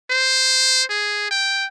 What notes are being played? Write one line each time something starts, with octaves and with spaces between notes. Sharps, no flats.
C5
G#4
G5